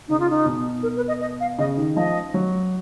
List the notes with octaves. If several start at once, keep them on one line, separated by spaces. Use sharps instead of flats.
C#3 D#4
F4
D#4
B2
A#4
B4
D#5
D#5
F5
C#3 D#5
D#3
F3 D#5
F#3